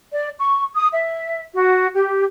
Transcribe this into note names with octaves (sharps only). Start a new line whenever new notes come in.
D5
C#6
D#6
E5
F#4
G4